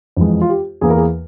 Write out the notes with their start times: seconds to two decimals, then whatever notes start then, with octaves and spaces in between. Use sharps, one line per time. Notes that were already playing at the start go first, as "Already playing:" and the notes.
0.17 F2 E3 G#3
0.41 F4
0.49 G4
0.81 E2 E3 A#3 G#4
0.90 A#4
0.97 G#4